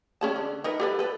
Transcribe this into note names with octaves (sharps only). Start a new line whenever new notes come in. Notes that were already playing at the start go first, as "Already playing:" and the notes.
C#4 G#4 A5
D3
D#4 A#4 B4
G4 A4 B4
A4 B4